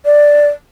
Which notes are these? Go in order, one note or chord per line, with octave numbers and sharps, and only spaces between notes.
D5